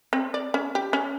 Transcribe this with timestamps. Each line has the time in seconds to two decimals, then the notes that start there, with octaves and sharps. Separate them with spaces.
0.13 C4
0.34 D5
0.54 C#4
0.75 G4
0.93 C#4